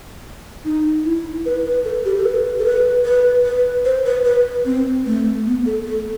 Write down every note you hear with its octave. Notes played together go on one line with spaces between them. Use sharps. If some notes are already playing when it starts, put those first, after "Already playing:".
D#4
E4
B4
B4
A4
G4
A4
B4
A4
B4
B4
B4
C5
B4
B4
C4
A3
B3
A4
A4